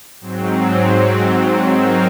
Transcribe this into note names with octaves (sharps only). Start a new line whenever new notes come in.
G#2 F#3 C4
F#3 C4 D#4 A#4